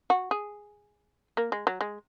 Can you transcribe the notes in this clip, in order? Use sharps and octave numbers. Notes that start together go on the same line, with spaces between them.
F#4
G#4
A#3
G#3
F#3
G#3